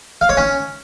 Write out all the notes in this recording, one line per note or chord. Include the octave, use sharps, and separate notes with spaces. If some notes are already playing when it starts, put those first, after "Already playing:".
F5
C#5
C#4